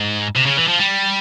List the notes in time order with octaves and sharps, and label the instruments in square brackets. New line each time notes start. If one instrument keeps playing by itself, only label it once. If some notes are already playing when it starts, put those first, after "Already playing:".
Already playing: [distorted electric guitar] G#2
C3
C#3
E3
F3
G3